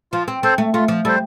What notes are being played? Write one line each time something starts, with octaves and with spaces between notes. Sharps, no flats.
F3 F4
C4
C4 A4 C5
A3
A3 F4
F3
G3 A4 C5